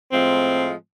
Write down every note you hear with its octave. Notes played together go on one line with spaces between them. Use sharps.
A2 F3 G#3 C4